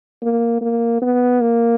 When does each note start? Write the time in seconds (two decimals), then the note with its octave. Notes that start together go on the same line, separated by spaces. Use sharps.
0.22 A#3
0.61 A#3
1.02 B3
1.41 A#3